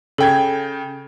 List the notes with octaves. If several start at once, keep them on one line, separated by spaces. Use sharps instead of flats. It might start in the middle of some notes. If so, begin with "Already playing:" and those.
C#3 A4 G5 G#6